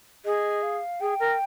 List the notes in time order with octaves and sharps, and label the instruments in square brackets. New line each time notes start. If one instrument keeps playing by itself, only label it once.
[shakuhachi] G#4 [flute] D#5
[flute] F5
[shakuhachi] G#4 [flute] G5
[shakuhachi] A#4